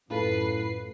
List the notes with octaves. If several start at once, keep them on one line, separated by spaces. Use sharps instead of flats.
F#2 A2 F4 A4 B4 C7